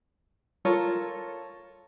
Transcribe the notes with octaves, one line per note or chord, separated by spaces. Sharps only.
F4 A4 A#4 C#5